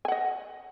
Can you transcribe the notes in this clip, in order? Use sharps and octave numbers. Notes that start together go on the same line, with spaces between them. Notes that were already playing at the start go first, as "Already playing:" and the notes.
D#5 F#5 G#5